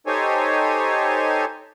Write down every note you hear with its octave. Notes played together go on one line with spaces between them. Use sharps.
D#4 G4 A4 C5 C#5 G#5